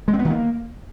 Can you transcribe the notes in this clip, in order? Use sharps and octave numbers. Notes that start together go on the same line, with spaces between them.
G#3
C4
B3
D#3
A#3